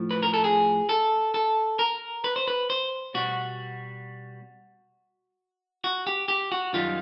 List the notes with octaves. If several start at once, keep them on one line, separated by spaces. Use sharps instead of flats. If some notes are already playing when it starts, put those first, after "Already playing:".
Already playing: A2 F3
B4
A#4
A4
G#4
A4
A4
A#4
B4
C5
B4
C5
B2 G3 F#4
F#4
G4
G4
F#4
F#2 D#3 G3 F4